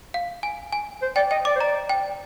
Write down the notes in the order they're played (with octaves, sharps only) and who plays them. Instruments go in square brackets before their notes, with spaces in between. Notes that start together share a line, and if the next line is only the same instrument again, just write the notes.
[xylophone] F5
G#5
G#5
[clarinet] C5
[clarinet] D5 [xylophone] G5
[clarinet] D#5 [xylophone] G5
[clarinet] D5 [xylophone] D6
[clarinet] C5
[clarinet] D5 [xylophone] A#5
[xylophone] G5